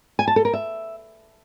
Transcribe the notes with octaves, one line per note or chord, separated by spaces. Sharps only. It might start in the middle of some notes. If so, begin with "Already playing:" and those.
G#5
A5
A4
A#4
E5